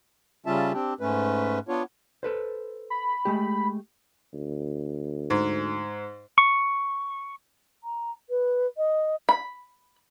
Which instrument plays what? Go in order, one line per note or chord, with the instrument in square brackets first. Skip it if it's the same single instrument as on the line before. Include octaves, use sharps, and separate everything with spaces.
[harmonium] C#3 G3 C#4 F4 E5 A5
C4 D4 G4
G#2 A3 C#4 B4
B3 D4 F4 C#5
[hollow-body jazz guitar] A4 B4 C5
[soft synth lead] B5
[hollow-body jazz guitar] G#3 A3 G4
[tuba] D2
[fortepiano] G#2
[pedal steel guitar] C#6
[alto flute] A#5
B4
D#5
[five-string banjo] B5